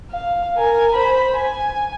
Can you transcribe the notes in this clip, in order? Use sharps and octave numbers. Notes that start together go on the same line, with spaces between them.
F5
A#4 G#5
C5 B5
G#5